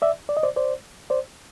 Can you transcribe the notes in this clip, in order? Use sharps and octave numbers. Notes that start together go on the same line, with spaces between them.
D5 E5
D5
D#5
C5 D5
C5 D5
C5 D5